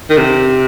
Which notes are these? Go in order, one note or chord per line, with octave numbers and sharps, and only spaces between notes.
D#3
C3